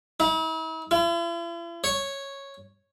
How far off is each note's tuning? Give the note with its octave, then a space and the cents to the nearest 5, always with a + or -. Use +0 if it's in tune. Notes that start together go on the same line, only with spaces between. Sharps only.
E4 -45
E4 +45
C#5 -5